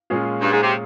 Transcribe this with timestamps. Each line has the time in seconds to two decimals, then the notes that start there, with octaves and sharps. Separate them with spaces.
0.10 A#2 G#3 C#4 F4 G#4
0.41 G2
0.52 G#2
0.63 C3